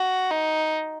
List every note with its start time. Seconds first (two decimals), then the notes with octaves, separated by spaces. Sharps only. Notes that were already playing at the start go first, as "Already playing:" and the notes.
Already playing: F#4
0.31 D#4